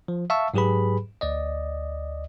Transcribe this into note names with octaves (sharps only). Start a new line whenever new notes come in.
F3
E5 F5 A5 C#6 E6
G#2 F#3 G4 G#4 B4 B5
D2 D5 D#5